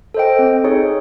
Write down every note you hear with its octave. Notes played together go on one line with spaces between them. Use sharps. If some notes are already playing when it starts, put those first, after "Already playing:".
A4 C5 D#5 G5
C4
D#4 G#4 C#5